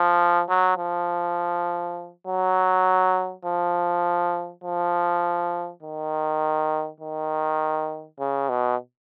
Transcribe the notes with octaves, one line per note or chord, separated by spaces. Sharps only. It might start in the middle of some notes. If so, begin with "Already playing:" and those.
Already playing: F3
F#3
F3
F#3
F3
F3
D#3
D#3
C#3
B2